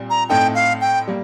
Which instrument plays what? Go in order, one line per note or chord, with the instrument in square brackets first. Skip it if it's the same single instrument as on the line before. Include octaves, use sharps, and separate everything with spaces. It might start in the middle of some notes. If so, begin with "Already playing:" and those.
Already playing: [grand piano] A#2 G3 C4
[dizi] A#5
[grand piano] A2 A3 C4 D#4 A4 [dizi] G5
[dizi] F5
G5
[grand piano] G3 A#3